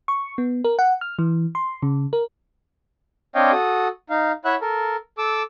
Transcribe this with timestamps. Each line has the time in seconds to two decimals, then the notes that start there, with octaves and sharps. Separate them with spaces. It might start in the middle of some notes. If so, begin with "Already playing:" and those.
0.08 C#6
0.38 B3
0.64 A#4
0.79 F#5
1.01 F6
1.19 E3
1.55 C6
1.83 C#3
2.13 A#4
3.35 C4 D4 C#5 D#5 F5 G5
3.52 F#4 A4 D#6
4.10 D#4 F5
4.45 E4 C#5 E5 F#5 B5 F#6
4.61 A4 A#4
5.18 A4 D6 E6